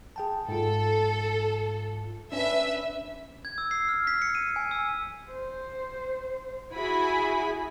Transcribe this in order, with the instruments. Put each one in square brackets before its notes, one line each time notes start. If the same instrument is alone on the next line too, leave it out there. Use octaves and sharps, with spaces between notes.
[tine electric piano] G#4 G5 A5
[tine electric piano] G#2 F4 [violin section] A4
[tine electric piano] C#4 D4 [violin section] B4 E5
[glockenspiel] G#6
E6
C7
F6
B6
C#7
D#7
G#5
E6
[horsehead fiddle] C5
[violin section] E4 G#5 B5 [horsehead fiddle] F#4 G#4